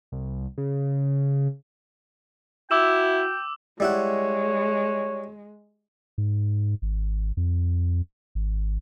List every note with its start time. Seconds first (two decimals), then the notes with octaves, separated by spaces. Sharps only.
0.12 C2
0.58 C#3
2.71 E4 F#4 G5 D6 E6 E7
3.80 G3 G#3 E4 C#5 F#5
6.18 G#2
6.82 G#1
7.37 F2
8.35 G#1